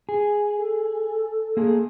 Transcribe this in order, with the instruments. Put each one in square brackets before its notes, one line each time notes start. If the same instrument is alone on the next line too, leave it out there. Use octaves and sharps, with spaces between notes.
[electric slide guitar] G#4
[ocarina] A4
[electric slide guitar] A#3 G#4